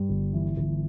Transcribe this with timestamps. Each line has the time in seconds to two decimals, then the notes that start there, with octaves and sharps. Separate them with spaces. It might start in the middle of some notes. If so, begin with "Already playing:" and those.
Already playing: G2
0.09 G1
0.33 E3
0.57 G1